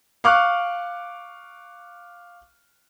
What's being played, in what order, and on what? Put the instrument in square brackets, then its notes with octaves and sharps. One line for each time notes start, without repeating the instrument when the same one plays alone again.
[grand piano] F5 C#6 D6 F6 F#6